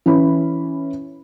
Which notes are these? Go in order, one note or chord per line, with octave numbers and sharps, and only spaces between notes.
E3 C#4 B5